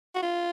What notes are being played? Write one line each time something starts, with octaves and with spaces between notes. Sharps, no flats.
F#4
F4